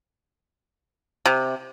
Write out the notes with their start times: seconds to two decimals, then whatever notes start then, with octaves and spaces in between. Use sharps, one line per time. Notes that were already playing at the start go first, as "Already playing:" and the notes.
1.26 C3